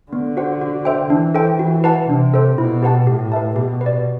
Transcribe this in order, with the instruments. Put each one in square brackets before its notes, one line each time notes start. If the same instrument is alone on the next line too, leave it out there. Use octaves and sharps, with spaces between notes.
[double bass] D3 [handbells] B3
[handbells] F#4 C5 F#5
F#4
C5 E5 G5
[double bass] E3 [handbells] D4
[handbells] A4 C5 G5
[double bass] E3 [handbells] F#4
[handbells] B4 F#5 A5
[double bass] C3 [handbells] D4
[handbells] A4 C5
[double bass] B2 [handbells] E4
[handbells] G4 B4 F#5 A5
[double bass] A2 [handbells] G4
[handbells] B4 E5 A5
[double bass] B2 [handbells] G4
[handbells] B4
D5